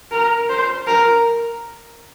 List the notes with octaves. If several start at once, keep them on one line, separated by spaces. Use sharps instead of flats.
A#4
C5
A#4